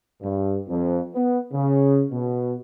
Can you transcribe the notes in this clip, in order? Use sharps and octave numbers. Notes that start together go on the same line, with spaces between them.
G2
F2
B3
C#3
B2